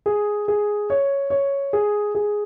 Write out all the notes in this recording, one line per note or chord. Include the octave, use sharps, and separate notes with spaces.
G#4
G#4
C#5
C#5
G#4
G#4